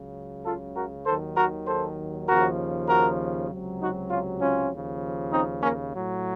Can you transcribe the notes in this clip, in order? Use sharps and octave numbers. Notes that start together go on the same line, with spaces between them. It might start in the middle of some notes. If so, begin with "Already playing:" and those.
Already playing: C#2 C#3 F#3
F4 A4
F#4 A#4
D#2 D#3 F#3 A4 C5
F#4 A#4
A4 C5
D#2 C#3 F3 F#4 A#4
F#4 A#4
C#2 C3 F#3
D#4 F#4
C#4 F4
C#4 F4
D#2 C#3 F3
C4 D#4
A#3 C#4
A2 F#3